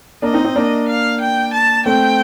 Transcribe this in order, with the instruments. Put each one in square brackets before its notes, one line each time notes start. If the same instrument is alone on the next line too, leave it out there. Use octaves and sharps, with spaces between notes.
[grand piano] A#3 D4 [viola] D#5
[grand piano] C4 D#4
C4 D#4
A#3 D4
[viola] F5
G5
A5
[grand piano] A3 C4 [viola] G5